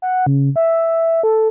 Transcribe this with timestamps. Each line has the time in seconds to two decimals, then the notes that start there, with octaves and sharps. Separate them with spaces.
0.02 F#5
0.26 C#3
0.56 E5
1.23 A4